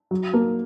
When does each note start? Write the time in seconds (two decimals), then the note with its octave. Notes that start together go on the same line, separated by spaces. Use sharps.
0.11 F#3
0.33 A#3